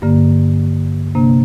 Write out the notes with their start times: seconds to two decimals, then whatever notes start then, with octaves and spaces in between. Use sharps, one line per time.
0.02 G2 D3 A#3
1.15 C3 A#3 D4